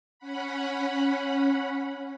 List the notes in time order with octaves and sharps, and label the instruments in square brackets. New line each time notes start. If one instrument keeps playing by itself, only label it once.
[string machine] C#4 F#5 B5